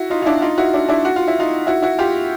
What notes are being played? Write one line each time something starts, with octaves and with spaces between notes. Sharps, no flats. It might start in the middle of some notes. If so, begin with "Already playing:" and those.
Already playing: E4 F#4
D#4 F4
F4
D4 E4
D#4 F4
E4 F#4
D4 E4
D4 E4
F#4
F4
E4
D#4 F4
E4 F#4
E4 F#4
F4 G4